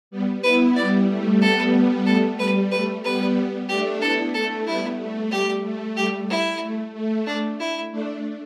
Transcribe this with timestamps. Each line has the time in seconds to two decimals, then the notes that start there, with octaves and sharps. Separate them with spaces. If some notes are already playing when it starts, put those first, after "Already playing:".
0.11 G3 B3
0.43 B3 E4 B4
0.75 G3 B3 D5
1.08 A3
1.41 G3 B3 A4
2.06 A3 A4
2.38 G3 B4
2.71 A3 B4
3.04 G3 B3 B4
3.69 A3 D4 G4
4.01 B3 E4 A4
4.34 A3 A4
4.66 G3 B3 E4
4.99 A3
5.31 G3 G4
5.64 A3
5.96 G3 G4
6.29 E4
6.61 A3
6.94 A3
7.26 D4
7.59 E4
7.91 A3 D4